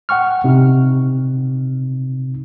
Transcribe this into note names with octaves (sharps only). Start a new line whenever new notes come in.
F#5 G5 C#6 F6
C3 D#4